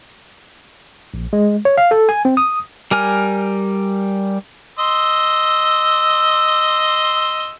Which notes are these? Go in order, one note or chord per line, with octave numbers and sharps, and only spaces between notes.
A#1
G#3
C#5
F5
A4
G#5
C4
D#6
G3 A#4 G#5 F6
D#5 C6 E6